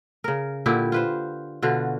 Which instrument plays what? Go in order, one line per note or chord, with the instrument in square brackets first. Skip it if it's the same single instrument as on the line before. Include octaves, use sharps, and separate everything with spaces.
[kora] C#3 A#4
A#2 D3 E4 G4
F4 B4 C5
B2 D3 F4 F#4